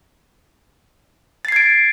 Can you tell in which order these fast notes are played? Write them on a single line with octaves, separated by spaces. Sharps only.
A6 C7 G#6 D7